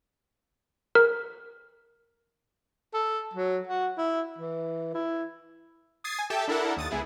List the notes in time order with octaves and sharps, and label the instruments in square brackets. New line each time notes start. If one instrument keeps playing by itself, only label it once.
[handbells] A#4
[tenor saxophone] A4
F#3
F#4
E4
E3
E4
[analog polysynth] D#6 G#6 A6 C7
G#5
G4 A4 E5 G5 A5
D4 E4 A4 A#4 F#5
D#2 D#6 A6
C#2 B3 E4 G#4